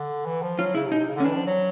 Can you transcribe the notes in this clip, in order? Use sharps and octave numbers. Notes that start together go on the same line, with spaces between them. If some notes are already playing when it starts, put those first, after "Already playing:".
Already playing: D3
E3
F3
F#3 F4
C#3 E4
C3
B2 D#4
C3
C#3
D3
C#4
E3 D4
F3
F#3